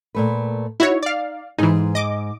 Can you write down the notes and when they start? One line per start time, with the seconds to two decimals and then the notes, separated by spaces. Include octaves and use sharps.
0.15 A#2 A3 B4
0.80 D#4 E4 F#4 C#5
1.03 D5 F5
1.58 G#2 E3 D#4 G#4 C5
1.95 D#5 D6